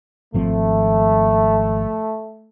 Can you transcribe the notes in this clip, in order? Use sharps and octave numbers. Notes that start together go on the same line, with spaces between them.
G#1 F3 A3 C4